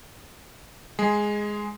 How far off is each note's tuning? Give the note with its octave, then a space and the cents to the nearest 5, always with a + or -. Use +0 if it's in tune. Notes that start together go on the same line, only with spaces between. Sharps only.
G#3 +0 G#4 +0